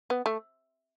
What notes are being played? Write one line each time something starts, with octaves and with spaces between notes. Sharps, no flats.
B3
A3